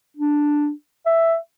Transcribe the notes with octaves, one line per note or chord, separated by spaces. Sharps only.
D4
E5